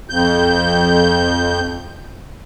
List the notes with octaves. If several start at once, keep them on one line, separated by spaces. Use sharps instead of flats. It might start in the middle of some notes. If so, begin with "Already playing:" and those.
F2 G6